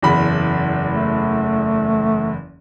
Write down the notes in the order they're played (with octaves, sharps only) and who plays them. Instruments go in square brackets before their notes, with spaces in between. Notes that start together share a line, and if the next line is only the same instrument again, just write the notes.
[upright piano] F#1 E2 B5
[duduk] A3